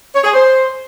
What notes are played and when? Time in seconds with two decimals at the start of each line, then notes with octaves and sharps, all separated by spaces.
0.14 C#5
0.24 G#4
0.33 C5